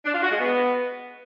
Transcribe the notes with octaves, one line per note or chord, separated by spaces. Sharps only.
D4
F4
F#4
G#3
B3